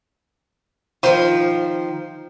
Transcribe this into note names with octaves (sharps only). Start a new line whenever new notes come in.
D#3 F3 F4 C5